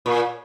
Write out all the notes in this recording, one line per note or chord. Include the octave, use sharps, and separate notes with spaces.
A#2